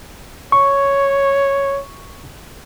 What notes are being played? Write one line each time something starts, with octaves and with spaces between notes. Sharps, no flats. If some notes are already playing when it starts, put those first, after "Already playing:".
C#5 C#6